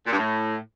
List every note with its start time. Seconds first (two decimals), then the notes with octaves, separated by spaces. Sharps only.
0.06 A#2
0.12 G2
0.18 A2